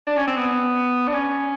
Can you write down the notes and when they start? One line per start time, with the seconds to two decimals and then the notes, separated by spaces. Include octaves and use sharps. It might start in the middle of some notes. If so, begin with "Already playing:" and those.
0.07 D4
0.17 C#4
0.27 C4
0.37 B3
1.07 D4
1.13 C#4